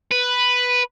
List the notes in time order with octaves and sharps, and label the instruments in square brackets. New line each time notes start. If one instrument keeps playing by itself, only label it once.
[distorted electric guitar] B4